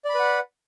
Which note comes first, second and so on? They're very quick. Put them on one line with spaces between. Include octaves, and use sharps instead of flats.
D5 B5 B4 F#5